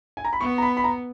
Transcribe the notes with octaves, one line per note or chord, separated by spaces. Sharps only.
G#5
A#5
B5
B3 C#6
A#5
B5
B5
A#5